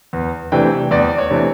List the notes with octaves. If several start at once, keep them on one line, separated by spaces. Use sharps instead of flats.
E2
C3 E3 A3 D4 G5
E2 D5
C#5
C3 E3 A3 D4